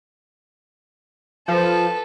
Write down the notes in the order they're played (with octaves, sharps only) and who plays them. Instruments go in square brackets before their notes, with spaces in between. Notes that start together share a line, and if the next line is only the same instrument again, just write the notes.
[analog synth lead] F3 [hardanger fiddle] A4 B4